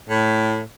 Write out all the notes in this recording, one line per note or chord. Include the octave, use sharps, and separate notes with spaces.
A2